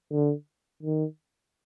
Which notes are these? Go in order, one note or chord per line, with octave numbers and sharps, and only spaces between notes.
D3
D#3